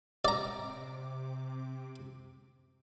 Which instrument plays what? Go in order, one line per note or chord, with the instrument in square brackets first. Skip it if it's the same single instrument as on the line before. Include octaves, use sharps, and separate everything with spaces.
[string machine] C3 D6 [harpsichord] D5 A#5